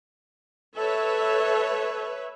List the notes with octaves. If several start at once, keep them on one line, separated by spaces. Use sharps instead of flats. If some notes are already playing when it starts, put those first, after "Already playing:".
A4 B4 C#5 E5